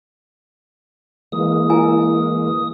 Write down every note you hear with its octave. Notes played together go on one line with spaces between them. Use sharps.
E3 G#3 A#3 D#6
E4 A#4 G#5